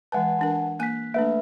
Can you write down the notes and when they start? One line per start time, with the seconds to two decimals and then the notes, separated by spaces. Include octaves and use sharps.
0.12 E3 G#3 B4 F#5 G#5 A5
0.39 E3 D4 A#4
0.79 A#3 G#5 F#6 B6
1.14 A3 A#3 D4 B4 E5